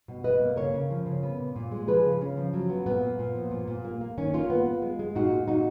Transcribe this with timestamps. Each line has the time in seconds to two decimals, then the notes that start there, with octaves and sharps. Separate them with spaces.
0.08 B2
0.24 B2 B4 D#5
0.40 A#3
0.56 C#3 A#4 C#5
0.74 C#3
0.90 F3
1.06 C#3
1.23 B3
1.39 A#2
1.56 A#2
1.71 G#3
1.88 F3 G#4 B4
2.05 C#3
2.21 C#3 C#4
2.37 F3
2.53 F#3
2.70 B3
2.86 A#2 B3
3.03 A#2
3.19 A#2
3.35 F3
3.51 A#2
3.68 A#2
3.85 A#3
4.01 A#3
4.18 D#3 C#4
4.34 A#3 C#4 F4
4.50 B3
4.66 B3
4.82 G#3
4.99 G#3
5.15 A#2 D#4 F#4
5.32 A#2
5.48 A#2 D#4 F#4